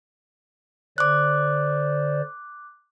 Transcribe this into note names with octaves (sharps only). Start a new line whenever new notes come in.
D3 C5 D5 D6 F#6